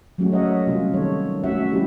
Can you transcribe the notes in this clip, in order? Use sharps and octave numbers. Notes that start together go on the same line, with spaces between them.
F#3 G#3 A3 C#4 F#4
A#4 C#5 D#5 E5 F#5
C3 G3 A#3 C#4 F4
D#3 A4 C#5
A3 C#4 F#4 E5 F#5
G3 A#3 C#4 E4 G4